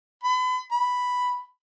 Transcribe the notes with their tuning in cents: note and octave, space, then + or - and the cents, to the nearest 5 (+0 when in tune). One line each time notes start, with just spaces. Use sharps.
B5 +35
B5 +0